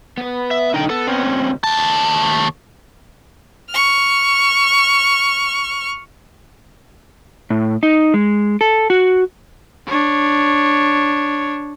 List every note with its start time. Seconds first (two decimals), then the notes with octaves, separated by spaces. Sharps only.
0.18 B3 B4
0.51 E5
0.74 B1 D3 D#4 G5
0.90 B3 A4
1.07 C4 C#4
1.23 D#2 C#3
1.64 D#2 A5
3.70 C#6 F6
7.50 A2
7.83 D#4
8.14 G#3
8.61 A4
8.90 F#4
9.88 D4 C#5